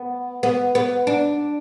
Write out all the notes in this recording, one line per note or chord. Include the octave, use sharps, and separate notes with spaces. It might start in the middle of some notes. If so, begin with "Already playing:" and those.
Already playing: B3
B3
B3
D4